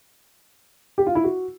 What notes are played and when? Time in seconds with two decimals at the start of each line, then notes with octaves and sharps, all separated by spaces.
0.98 G4
1.07 F4
1.15 E4
1.24 F#4